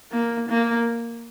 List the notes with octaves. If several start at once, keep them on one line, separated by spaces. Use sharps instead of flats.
A#3
A#3